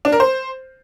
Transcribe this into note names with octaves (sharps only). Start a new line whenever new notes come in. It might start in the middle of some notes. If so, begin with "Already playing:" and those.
D4
A#4
C5